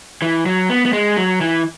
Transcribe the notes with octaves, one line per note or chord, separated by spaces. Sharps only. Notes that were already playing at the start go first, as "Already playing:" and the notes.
E3
F#3
B3
B3
G#3
F#3
E3